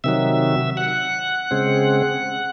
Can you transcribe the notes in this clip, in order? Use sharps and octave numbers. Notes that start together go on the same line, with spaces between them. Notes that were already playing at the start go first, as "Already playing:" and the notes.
C3 D#3 F#3 E5
F#5
C#3 G#3 C4